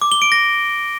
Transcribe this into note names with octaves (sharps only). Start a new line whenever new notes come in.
D6
G7
D7
A#6